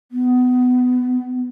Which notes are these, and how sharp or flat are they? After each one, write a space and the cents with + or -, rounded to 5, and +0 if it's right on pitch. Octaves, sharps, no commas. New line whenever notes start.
B3 +20